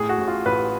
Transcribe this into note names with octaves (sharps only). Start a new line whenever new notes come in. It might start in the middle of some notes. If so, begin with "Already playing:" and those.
Already playing: A2 G#4
F#4
A1
F4
A1 B4